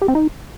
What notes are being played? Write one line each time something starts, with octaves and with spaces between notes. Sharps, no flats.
G4
C4
D#4